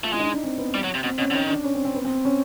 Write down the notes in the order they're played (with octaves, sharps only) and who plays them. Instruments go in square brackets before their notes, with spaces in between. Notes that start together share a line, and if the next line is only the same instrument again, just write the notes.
[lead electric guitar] A3 [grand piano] F4
[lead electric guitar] G#3 [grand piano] E4
[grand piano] D#4
D4
D4
C4
B3
[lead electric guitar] G3
F#3
C3
[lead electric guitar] B2 [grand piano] C4
[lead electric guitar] B2 [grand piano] C#4
[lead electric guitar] D3
[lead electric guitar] D#3 [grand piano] C#4
[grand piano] D4
C#4
C4
C4
B3
C4
C#4